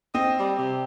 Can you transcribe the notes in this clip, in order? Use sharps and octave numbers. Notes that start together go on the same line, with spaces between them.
C4 D#5
G3
C3